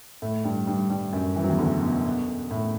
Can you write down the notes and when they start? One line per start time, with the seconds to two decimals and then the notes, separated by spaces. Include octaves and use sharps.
0.22 A2 A3
0.44 G2 G3
0.67 G2 G3
0.90 G2 G3
1.13 F#2 F#3
1.36 E3
1.44 F#3
1.50 E2 E3
1.59 D2 D3
1.82 B2
2.05 B2
2.51 A2